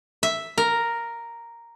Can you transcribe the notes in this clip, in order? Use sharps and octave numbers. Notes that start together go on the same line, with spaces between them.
E5
A#4